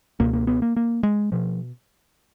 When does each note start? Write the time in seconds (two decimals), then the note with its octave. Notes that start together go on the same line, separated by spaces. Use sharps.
0.20 C#2 B2 A#3
0.33 A#3
0.47 B3
0.62 A#3
0.76 A#3
1.03 G#3
1.32 B2 F3